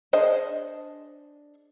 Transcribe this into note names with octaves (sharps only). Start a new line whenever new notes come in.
D4 G#4 C5 D#5 A5